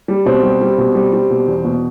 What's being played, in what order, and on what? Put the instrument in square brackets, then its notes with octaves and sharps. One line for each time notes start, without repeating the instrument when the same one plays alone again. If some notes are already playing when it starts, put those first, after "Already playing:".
[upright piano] G3
B2 C4
G3
G3
B2
G3
G3
B2
E2
B2